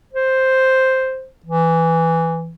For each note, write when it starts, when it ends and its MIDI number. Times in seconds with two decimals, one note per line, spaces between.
0.13 1.27 72
1.45 2.55 52